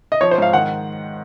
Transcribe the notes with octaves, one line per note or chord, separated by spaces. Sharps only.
D#5
F3 C#5
C5
G#2 F5
D#3 F#5